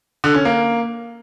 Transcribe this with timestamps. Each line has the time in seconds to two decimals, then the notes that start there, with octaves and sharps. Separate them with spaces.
0.24 D3
0.34 C#4
0.45 A#3